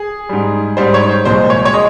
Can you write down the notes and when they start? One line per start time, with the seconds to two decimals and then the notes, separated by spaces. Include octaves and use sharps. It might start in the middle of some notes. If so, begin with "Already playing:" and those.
Already playing: G#4
0.29 G#2 G3
0.77 G#2 G3 C5
0.94 C#5
1.09 C5
1.25 C2 A#2 F3 G#3 C5
1.50 C#5
1.65 C#5
1.73 G#3 D#5